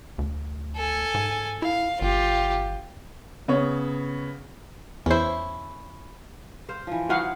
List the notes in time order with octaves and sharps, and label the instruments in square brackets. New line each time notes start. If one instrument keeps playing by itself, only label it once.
[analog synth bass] D2
[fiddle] A4 G#5
[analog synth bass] G#2
[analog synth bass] E4 [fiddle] F5
[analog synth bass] G1 [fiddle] F4 G4
[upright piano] C#3 B3 C#5
[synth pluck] E2 C5 [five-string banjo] C#4 E4
[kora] C5 F5
E3 F3
[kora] F3 D#4 E4 [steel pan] F#4 F5 F#5